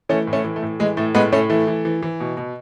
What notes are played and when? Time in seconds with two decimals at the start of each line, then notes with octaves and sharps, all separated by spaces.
0.09 E3 A3 C#4
0.27 A2
0.33 A3 C#4
0.45 E3
0.56 A3
0.63 A2
0.80 E3 G#3
0.97 A2 A3
1.15 A2 G#3 B3
1.32 A2 A3 C#4
1.50 E3 A3
1.67 E3
1.85 E3
2.02 E3
2.20 B2
2.37 B2